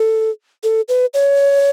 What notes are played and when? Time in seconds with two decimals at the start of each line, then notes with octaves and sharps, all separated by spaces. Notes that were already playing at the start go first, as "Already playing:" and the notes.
Already playing: A4
0.64 A4
0.88 B4
1.14 C#5